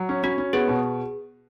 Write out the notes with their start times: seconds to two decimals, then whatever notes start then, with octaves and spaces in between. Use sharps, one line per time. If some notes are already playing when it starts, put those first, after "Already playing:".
Already playing: F#3
0.09 C#4
0.23 C#4 F#4
0.38 C#4
0.53 B3 G#4
0.68 B2